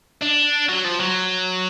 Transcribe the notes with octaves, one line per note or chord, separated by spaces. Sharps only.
D4
F#3
F3
F#3